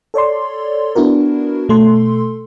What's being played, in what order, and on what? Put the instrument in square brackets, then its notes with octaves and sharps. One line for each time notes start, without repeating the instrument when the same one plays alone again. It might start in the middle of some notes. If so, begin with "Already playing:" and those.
[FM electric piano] A4 C#5 D5 C6
B3 D4 E4 F#4 A#4
B2 A3 A4 C6